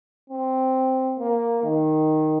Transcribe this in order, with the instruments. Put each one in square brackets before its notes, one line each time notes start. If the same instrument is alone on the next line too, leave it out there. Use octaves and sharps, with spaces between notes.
[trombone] C4
A#3
D#3